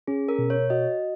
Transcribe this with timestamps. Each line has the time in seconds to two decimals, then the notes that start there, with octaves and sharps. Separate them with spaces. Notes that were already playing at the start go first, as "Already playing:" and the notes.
0.07 C#4 G#4
0.29 A#4
0.39 B2
0.50 C#5
0.70 F#4 D#5